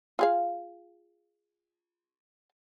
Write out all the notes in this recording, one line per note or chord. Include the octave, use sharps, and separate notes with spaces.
F4 G#4 F5